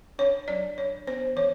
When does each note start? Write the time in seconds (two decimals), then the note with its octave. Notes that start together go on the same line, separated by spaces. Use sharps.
0.19 D4 C#5
0.48 F#3 D5
0.77 D4 C#5
1.07 B3 C5
1.36 E3 C#5